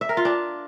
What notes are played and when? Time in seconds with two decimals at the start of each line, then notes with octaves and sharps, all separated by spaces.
0.01 E5
0.09 A#4
0.17 F4
0.25 D4